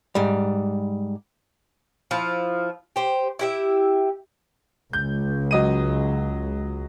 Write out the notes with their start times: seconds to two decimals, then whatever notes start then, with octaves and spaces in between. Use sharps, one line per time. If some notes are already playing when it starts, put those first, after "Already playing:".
0.15 G#2 G3
2.11 F3 E4
2.96 G4 C5
3.39 E4 G4 E5
4.93 C#2 G6
5.51 F#3 D#5 D#7